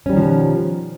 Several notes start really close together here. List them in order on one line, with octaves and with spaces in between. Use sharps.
C#4 G3 D#3 F3 B2